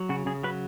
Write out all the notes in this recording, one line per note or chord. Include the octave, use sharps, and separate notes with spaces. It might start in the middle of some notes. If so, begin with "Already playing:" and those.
Already playing: F#3
C#3 F#4
C#3 G#4
F#3 B4